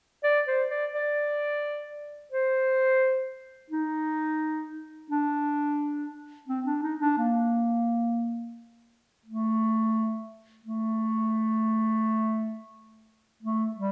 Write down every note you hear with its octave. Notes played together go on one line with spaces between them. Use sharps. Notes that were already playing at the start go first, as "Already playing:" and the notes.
D5
C5
D5
D5
C5
D#4
D4
C4
D4
D#4
D4
A#3
A3
A3
A3
G3